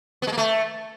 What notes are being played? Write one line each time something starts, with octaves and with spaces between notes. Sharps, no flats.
B3
G#3
A#3
A3